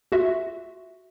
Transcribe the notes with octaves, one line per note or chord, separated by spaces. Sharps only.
F4 F#4 E5